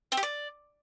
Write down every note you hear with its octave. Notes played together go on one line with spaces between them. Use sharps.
C4
G4
D5